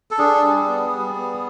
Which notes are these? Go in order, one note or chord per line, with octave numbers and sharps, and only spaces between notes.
A4
D4 G#4
G3
B3
G3
B3